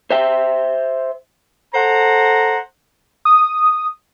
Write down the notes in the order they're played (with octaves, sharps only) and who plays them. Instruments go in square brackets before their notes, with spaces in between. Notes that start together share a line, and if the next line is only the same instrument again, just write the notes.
[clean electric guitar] C5 E5 G5
[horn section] A4 C5 F#5 A#5
[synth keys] D#6